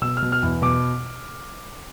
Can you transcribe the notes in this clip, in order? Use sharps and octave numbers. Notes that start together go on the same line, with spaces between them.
B2 E6
F6
B2
F6
E2
B2 D6